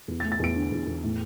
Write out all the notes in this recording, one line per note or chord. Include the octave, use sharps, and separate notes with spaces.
E2
A6
A3
A6
E2 D7
D3
E2
E2
A2